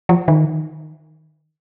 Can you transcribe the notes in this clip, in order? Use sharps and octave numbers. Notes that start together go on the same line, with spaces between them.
F3
D#3